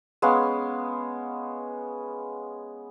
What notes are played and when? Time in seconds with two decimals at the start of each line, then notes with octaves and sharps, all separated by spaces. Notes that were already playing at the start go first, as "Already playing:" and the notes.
0.22 G#3 B3 C#4 F5